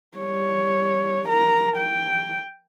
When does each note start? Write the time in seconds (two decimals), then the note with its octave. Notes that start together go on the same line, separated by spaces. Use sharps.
0.18 G3 C#5
1.28 A#4 A#5
1.77 G5